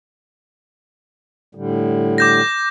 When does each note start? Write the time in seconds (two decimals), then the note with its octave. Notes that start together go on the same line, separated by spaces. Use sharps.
1.55 A2 D3 G3
2.18 D6 G6 A#6